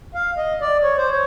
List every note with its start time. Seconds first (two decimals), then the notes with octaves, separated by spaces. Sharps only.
0.14 F5
0.37 D#5
0.61 D5
0.83 C#5
0.97 C5
1.11 C#5